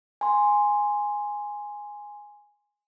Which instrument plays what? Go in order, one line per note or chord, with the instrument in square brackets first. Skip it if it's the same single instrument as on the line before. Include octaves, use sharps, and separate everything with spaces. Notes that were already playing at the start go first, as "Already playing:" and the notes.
[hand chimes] G#5 C6